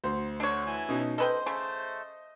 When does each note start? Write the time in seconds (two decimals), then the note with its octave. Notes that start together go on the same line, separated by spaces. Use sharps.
0.04 D2 C5
0.40 D3 D4 C#5
0.66 E3 G#5
0.88 B2 C#4 D#4
1.18 A4 B4 C5 D#5 G5
1.46 C#3 A3